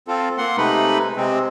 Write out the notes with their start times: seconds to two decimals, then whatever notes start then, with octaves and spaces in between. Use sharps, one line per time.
0.08 C4 F4 A4
0.38 A#3 F#5 C6
0.58 C3 G#3 A3 D#4 B4 B5
1.17 C3 G#3 C4